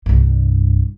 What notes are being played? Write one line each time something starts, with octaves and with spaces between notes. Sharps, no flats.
C2 G2